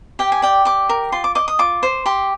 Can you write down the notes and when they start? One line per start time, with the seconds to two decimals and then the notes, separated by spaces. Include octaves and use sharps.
0.19 G4 G5
0.32 G#5
0.42 D5 G5
0.65 G4 D6
0.89 A#4
1.12 F4 C6
1.24 D6
1.35 D#5 D6
1.48 D#6
1.59 F4 D6
1.83 C5
2.06 G4 C6